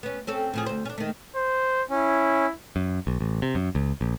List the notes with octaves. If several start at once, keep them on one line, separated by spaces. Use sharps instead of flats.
B3 C#4
C4 C#4 A4
A2 F3 G#4
D2 C5
C#4 D4
D#3 A3
C5
C#4 E4
F#2
B1
A1
C3
F#2
C#2
A#1